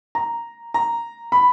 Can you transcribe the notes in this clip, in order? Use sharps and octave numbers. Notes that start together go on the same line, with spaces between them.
A#5
A#5
B5